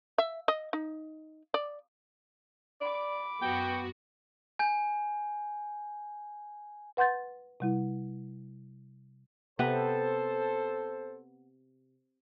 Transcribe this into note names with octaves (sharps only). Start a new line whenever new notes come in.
E5
D#5
D#4
D5
D5 B5 D6
F#2 B3 F#4 G5
G#5 G6
B4 F#5 C6 G6 A6
C3 G3 E4
C3 B3 A4 B4 C5